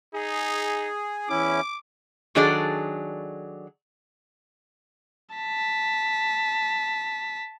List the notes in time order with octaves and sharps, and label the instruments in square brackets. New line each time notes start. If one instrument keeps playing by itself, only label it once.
[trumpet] D#4 [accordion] G#4
[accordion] E2 C#4 E4 [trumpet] D6
[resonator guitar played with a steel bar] D#3 F#3 D4 G#4 A4 D5
[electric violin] A5 B6